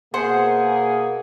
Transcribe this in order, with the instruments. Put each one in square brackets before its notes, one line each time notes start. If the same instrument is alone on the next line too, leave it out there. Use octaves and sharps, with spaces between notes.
[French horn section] B2 A#3 [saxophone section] G#4 [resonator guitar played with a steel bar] C5 [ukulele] F#5